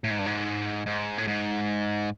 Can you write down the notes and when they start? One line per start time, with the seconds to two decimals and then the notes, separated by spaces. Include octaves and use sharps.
0.04 A2
0.11 G#2
0.19 G2
0.26 G#2
0.86 G#2
1.18 A2
1.27 G#2